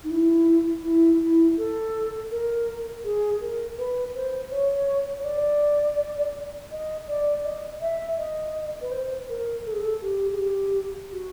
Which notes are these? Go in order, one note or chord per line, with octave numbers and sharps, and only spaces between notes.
D#4
E4
E4
E4
A4
A#4
G#4
A#4
B4
C5
C#5
C#5
D5
D#5
D5
D#5
E5
D#5
B4
C5
A#4
A4
G#4
A4
G4
G#4
G4
F#4